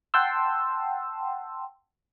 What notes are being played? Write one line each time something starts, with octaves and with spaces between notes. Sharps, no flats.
F#5 G5 A5 C6 E6